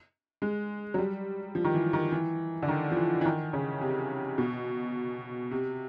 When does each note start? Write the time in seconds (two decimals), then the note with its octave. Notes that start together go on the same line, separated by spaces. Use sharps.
0.42 G#3
0.94 F#3
0.98 G3
1.55 F3
1.64 D#3
1.74 E3
1.93 D#3
2.12 E3
2.62 D3
2.68 D#3
2.91 F3
2.97 E3
3.21 E3
3.25 D#3
3.53 C#3
3.81 C3
4.38 B2
5.51 C3